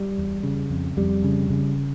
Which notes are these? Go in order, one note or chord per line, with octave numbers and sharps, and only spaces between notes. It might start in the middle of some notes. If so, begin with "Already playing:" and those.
Already playing: G3
E2
C#3
F2
F2 G3
C#3
C#3